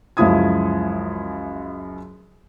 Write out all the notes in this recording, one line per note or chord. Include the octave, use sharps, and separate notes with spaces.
C#2 F#2 F3 E4 D#6 G#6